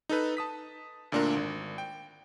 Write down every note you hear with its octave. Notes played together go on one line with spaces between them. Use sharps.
D#4 A4 B4
A5 D#6 B6
D2 A#2 D4 F4 A#4
G#1
G5